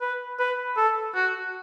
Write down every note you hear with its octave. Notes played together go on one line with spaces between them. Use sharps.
B4
B4
A4
F#4